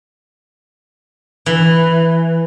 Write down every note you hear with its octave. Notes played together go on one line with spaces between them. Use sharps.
E3